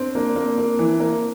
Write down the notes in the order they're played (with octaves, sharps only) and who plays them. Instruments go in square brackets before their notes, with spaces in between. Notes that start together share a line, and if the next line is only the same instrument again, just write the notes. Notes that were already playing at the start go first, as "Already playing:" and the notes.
Already playing: [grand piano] C4 D4
[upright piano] A#3 [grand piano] D4
[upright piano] A#3
A#3
E3
A#3